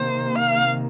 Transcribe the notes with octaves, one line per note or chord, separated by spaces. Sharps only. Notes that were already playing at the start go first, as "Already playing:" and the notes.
Already playing: C3 D#3 A#3 C5
F5